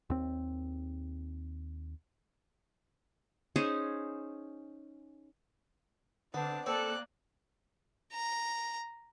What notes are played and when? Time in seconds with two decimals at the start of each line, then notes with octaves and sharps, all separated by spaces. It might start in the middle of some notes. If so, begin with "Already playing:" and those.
0.10 D#2 C4
3.56 C#4 D#4 G#4 C5
6.34 D3 B3 C4 D4 A5
6.66 A#3 C4 A4 D5 F#6
8.12 A#5